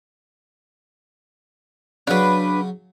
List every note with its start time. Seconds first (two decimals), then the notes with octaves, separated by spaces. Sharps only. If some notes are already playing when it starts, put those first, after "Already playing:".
2.07 C#3 F#3 D4 B4